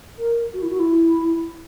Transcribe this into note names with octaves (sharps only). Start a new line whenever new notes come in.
A#4
F#4
E4
F#4
E4